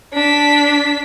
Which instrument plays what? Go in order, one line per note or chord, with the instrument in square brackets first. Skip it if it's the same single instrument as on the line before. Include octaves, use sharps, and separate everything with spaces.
[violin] D4 B6